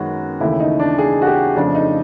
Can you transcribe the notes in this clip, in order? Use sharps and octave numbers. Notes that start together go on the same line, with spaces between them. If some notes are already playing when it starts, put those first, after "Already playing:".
Already playing: F#2 D#3 G#3 B3 F#4
D#2 C#3 E3 A3 E4
D#4
D4
G#4
F#4
G4
F2 C#3 F3 A3 D4
D#4